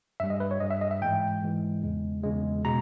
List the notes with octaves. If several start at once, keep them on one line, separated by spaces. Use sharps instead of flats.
G2 G3 E5
D#5
B4
C#5
G2 G3 D#5
E5
D#5
E5
G#2 E3 G#3 G5
G#2 E3 G#3
E2 C#3 G#3
E2 C#3 G#3
B2 G#3 A#5